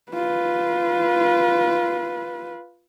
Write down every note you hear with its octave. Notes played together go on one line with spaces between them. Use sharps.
F4 B4